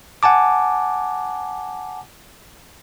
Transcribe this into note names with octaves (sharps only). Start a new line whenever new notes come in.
F#5 G#5 A5 D6